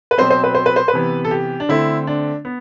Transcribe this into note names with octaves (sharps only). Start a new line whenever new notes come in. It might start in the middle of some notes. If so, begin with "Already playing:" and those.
B4
B2 F#3 C4 C5
C5
B4
C5
B4
C5
B4
C3 E3 B3
A4
G4
D4
D3 A3 C4 E4
D4
B3